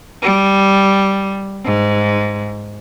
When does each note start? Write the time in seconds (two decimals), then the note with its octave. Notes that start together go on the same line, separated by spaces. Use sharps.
0.22 G3
1.65 G#2